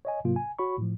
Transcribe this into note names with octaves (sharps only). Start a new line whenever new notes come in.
C#5 D#5 G#5
G#2 C3 F#3 A#3 F4
G#5
F#4 C#5 B5 C#6
A2 F3